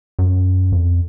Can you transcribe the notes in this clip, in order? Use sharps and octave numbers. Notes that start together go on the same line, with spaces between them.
F#2
F2